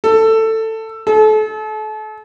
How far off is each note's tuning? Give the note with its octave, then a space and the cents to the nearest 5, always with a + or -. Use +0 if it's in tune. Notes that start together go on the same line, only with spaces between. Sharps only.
A4 +15
A4 -35